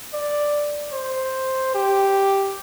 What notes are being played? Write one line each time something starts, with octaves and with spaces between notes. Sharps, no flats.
D5
C5
G4